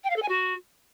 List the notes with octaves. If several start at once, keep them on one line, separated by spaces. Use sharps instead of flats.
G5
F5
A4
G#5
F#4